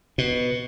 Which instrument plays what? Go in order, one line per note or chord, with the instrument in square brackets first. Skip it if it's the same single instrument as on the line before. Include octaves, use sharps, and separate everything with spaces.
[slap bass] B2